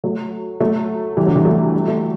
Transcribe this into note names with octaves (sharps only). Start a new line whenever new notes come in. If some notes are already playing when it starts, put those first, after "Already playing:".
F#3 A3
F#3 A3
E3 G3
D3 F#3
E3 G3
F#3 A3
G3
A3